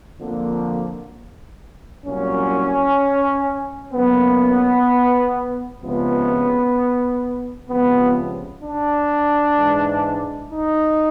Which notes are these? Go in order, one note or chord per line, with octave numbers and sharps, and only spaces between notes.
F2 D3 F3 A#3
C2 A#2 F#3 C#4
F#2 C#3 F#3 A#3 B3
C#2 C3 F3 G#3 B3
C#2 C3 F3 B3
D4
G#2 E3 G#3
D#4